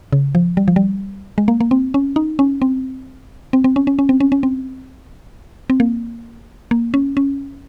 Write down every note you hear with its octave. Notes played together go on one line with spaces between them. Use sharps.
C#3
F3
G3
F3
G3
G#3
A#3
A#3
C4
C#4
D#4
C#4
C4
C4
C4
C#4
C#4
C#4
C4
C#4
C#4
C4
C4
A#3
A#3
C#4
C#4